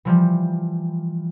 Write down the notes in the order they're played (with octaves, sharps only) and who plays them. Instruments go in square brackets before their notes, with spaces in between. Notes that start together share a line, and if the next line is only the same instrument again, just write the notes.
[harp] E3 F3 G3